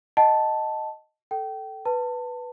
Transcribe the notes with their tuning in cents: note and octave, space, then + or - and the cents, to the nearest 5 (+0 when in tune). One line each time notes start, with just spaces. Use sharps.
D#5 +0 F#5 +35 A5 +0
A4 +0 G5 -25
B4 +0 A5 +25